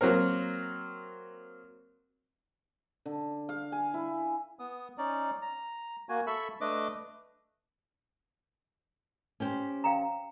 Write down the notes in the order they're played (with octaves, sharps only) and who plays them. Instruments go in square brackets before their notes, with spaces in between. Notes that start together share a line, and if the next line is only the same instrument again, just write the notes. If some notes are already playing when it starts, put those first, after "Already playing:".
[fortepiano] F#3 A#3 C4 A#4
[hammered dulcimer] D3
F5
G#5
E4
[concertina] B3 D#6
C#4 D#4 D5
A#5
A#3 F#4 G#5
A4 E5 B5 C#6
A3 D4 B4 D#5 D6
[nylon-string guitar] C#4 G4 C5
[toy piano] F5 G5 A#5